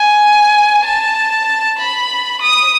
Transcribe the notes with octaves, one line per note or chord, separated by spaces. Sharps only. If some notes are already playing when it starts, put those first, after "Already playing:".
Already playing: G#5
A5
B5
D#6